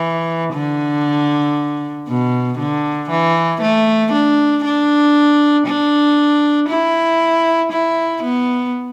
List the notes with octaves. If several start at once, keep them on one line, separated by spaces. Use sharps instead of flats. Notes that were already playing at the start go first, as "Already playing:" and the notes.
Already playing: E3
D3
B2
D3
E3
A3
D4
D4
D4
E4
E4
B3